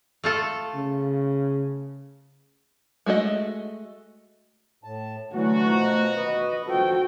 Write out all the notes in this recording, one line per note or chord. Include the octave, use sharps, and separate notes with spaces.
A3 F4 A4
C#3
G#3 A3 F#4 D#5
A2 A5
D3 E3 F#3 A3 F#4
B2 F3 A#5
B4 D#5
F3 F#4 A4 G5